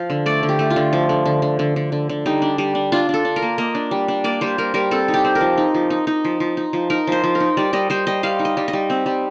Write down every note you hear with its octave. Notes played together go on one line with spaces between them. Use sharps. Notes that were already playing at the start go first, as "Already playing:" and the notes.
Already playing: F3 F5
D3
A3 D5
D3
G4
A3
F4
D3
F3
D3
D3
D3
D3
D3
D3
D3
G3 D#4
D4
G3
D4
D4 F4
D4 A4
D4
A#4
A#3
A#3 D#5
D4
G3
D4
A#3 D5
G3 C5
G3 A#4
G3 A#4
C4 A4
D#4
G4
C4
A#4
F3
D#4
F3
D#4
D#4
F3
F3
D#4
F3
D#4 A#4
F3 C5
F3
A#4
D#4
G3 D5
G3 D#5
G3 C5
G3 D#5
G3 F5
D#4
D#5
G3
D#5
G3
C4
G3